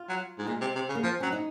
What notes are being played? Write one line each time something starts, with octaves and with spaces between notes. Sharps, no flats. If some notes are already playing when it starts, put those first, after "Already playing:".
Already playing: F4
F#3
G#2
A#2 G#3
C3
C3
C#3
A#3
F3 C4
F#3 C#4
D#4